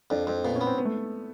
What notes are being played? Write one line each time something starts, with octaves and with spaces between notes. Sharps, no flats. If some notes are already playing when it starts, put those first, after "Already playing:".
F2 D4
F2 C4
A#2 B3
C#4
B3
C4
B3
A3